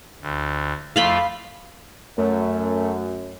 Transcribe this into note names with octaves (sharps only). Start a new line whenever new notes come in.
D2
F2 A3 F4 F5 B5 C6
F#2 A3